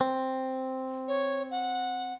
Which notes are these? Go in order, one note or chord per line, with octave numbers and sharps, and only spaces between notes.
C4
C#5
F#5